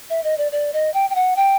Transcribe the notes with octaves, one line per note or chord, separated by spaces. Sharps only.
E5
D#5
D5
D5
D#5
G5
G5
F#5
G5